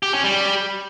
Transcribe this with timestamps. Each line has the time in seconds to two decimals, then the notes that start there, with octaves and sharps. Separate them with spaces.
0.03 G4
0.13 C#4
0.24 G3